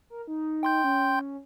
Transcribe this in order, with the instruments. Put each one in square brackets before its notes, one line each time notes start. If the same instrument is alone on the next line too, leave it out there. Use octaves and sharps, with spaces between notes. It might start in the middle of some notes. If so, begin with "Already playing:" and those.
[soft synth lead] A#4
D#4
[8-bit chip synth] G5 C6 G6
[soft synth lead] C#4